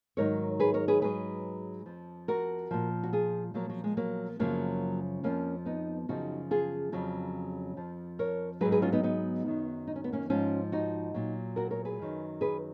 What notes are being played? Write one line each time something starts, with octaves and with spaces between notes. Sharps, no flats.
G#2 D#3 F#3 A#4 C#5
G#4 B4
A#4 C#5
G#4 B4
G#2 F#3 G#4 B4
F2 F3
F#4 A#4
A#2 F3
F#4
F4 G#4
A#2 F3 F#3 A#3
F#3
G#3
F#3 A#3
F#2 C#3 F3 F#3 A#3
F2 F3 A#3 C#4
B3 D#4
F#2 C#3 F3 D#4 F#4
F4 G#4
F2 C#3 F#3
F2 F3
A#4 C#5
G#2 F#3 G#4 B4
G#4 B4
C#4 F4
B3 D#4
B3 D#4
F#2 D#3 F#3
D#4
C#4
B3
A#3 C#4
G#2 F3 C#4 F4
D#4 F#4
A#2 F#3
F#4 A#4
A#4 C#5
G#4 B4
F#2 D#3 F#3
G#4 B4